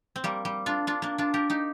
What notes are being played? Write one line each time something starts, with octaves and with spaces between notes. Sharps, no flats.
C4
G3 A#3
G3
D4 F4
D4 F4
A#3 D4
D4 F4
G4 A#4
D#4 G4